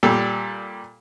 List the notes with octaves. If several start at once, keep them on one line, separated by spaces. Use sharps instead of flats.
A#2 G3 A4